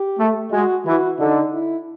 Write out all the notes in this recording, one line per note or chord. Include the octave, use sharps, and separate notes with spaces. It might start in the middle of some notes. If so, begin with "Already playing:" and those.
Already playing: G4
A3
G#3 F#4
E3 F#4
D3 D#4
E4